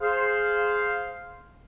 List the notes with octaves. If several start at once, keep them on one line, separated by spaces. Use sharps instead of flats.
G#4 C5 F5